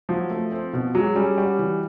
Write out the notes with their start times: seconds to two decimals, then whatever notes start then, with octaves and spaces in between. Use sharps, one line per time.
0.09 F3 F#3
0.30 A3
0.52 C4
0.73 B2
0.95 F#3 G#3
1.15 G3 C#4
1.38 G3 F#4
1.59 E3